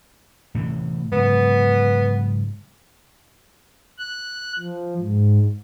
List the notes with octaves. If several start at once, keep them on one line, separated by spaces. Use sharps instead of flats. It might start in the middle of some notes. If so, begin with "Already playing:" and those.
A2 C3 E3
G#2 C#3 F#3 B3
F#6
F3
G#2